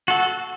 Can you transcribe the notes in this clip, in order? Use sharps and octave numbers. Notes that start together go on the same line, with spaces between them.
F#4 A4